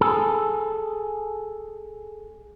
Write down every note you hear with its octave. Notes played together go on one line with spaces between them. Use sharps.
G#4 A4